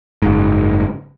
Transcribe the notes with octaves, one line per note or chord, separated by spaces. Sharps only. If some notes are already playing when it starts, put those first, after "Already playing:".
F#1 G#2